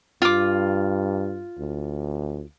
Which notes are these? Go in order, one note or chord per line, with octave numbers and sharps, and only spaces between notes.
G2 F4 D6
D2